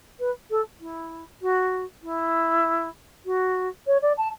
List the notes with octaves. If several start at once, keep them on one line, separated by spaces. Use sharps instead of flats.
B4
A4
E4
F#4
E4
F#4
C#5
D5
A5